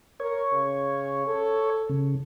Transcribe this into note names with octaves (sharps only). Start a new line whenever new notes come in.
A#4 C#5
C#3
A4
C#3